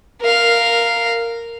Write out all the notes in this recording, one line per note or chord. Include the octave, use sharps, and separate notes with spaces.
A#4 F5